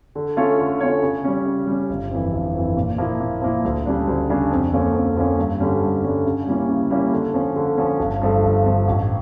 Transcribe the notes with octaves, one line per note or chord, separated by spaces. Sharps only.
D3
A3 C#4 F4 C#5
D3
A3 C#4 F4 C#5
C#3
G3 C#4
C#3
G3 C#4
G1
F2 E3
G1
F2 E3
A#2
F3 A#3 E4
A#2
F3 A#3 E4
D2
C#3 G3 D4
D2
C#3 G3 D4
F2
D3 F3 A#3 C#4
F2
D3 F3 A#3 C#4
G2
D3 G3 C#4
G2
D3 G3 C#4
C#3
G3 A#3 C#4 E4
C#3
G3 A#3 C#4 E4
D3
F3 C#4
D3
F3 C#4
G1
G2 F3 A3
G1
G2 F3 A3
A1